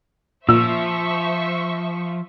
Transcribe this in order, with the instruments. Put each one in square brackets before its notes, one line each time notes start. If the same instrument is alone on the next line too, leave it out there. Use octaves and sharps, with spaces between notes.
[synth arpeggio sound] A#2 [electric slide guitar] F3 [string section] C5 E5 C#6 [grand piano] E6